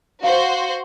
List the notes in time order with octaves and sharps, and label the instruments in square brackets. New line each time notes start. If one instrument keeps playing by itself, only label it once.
[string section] F#4 C5 [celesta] F5